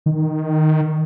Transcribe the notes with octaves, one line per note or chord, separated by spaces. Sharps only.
D#3